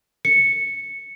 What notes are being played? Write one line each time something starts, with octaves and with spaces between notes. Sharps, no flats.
C#7